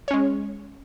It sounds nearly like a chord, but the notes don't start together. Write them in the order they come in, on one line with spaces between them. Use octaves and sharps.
C#5 C#4 G#3